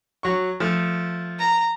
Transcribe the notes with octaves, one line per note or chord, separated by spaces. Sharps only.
F#3 C#6
F3 A3
A#5